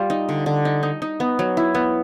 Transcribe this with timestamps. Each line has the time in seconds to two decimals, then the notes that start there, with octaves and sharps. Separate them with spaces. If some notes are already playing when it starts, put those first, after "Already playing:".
Already playing: G3 F4
0.10 D#4
0.29 D3
0.46 D3
0.65 D#4
0.83 D#4
1.02 D#4
1.20 B3
1.39 F#3
1.57 E4
1.75 B3